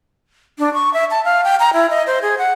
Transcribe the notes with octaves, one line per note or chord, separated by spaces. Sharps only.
D4
C#6
E5
A5
F5
G5
A#5
E4
D#5
C5
G#4
F#5